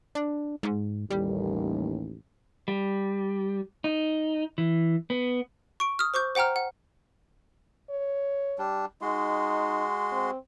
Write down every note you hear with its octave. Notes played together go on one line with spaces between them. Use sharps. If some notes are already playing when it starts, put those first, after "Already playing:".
D4
G#2
A1 D#2 G3
G3
D#4
E3
B3
C#6 D7
D#6 F6
C5 C#6 D6 G6
C5 F#5 G5 A#5 F6
F#5
C#5
G3 D4
G#3 D#4 F#4 C6
C4